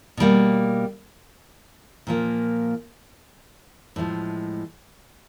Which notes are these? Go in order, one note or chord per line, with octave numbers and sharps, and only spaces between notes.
B2 G3 A#3
A#2 F3 A#3
A2 F3 G#3